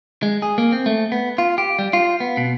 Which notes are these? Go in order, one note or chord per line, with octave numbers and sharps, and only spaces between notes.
G#3
G#4
A#3
C4
A3
B3
F4
G4
G3
F4
B3
B2